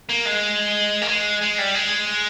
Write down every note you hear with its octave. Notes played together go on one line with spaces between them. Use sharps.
A#3
G#3
A#3
G#3
G#3
G3
G#3